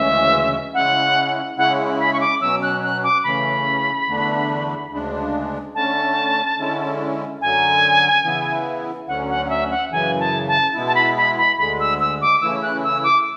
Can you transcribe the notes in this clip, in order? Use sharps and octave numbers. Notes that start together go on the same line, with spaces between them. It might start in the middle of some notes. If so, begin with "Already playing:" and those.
Already playing: D2 C#3 E3 G#3 C#4 E5
C#3 G#3 C#4 E4 F#5
C#3 G#3 C#4 E4 F#5
B5
C#6
D6
B2 F#3 C#4 E6
F#6
F#6
D6
C#3 E3 A3 C#4 B5
E2 D3 A3 D4
D2 C#3 G#3 D4
D3 A3 C#4 A5
D3 G#3 C#4 E4
F#2 D3 F#3 G#5
C#3 E3 B3 E4
D2 D3 F#3 C#4 F#5
F#5
F#5
E5
F#5
F#2 C#3 E3 G#5
A5
A5
B2 G#3 B3 E4
A5
B5
B5
B5
D2 D3 G#3 B5
E6
E6
D6
C#3 E3 A3 C#4 E4 E6
F#6
E6
D6